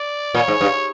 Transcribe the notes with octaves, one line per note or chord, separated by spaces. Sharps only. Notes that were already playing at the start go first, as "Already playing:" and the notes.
Already playing: D5
A#2 C#5
G#2
G2